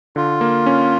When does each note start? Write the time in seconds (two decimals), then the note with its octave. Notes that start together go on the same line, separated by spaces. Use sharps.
0.16 D3 F4
0.41 A#3
0.66 C#4